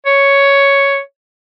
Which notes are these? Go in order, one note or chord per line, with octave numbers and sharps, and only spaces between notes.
C#5